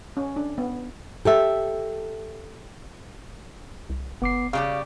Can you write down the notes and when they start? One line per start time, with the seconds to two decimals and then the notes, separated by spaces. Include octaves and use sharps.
0.17 C#4
0.36 D4
0.58 B3
1.25 G4 A4 E5
3.90 C2
4.22 F#1 B3 D6 C7
4.53 C#3 G3 G4 F5